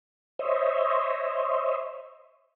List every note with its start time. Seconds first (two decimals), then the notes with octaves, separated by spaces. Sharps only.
0.39 C5 C#5 D#5 E5